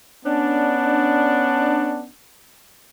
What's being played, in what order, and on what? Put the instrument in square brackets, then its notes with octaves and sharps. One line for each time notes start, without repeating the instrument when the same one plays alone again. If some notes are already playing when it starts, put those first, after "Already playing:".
[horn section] B3 C#4 D4